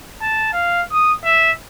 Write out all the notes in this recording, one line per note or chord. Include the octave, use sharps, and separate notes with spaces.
A5
F5
D#6
E5